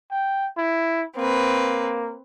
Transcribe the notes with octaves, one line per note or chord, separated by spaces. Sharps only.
G5
E4
A#3 C4 B4